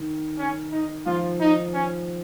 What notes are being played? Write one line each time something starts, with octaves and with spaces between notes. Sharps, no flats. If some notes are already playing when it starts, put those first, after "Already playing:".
Already playing: D#3
C#4
D#4
F3 F4
D#4
C#4